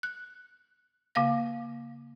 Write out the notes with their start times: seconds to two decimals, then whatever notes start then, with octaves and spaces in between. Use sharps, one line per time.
0.03 F#6
1.15 C#3 A#3 F5 A#6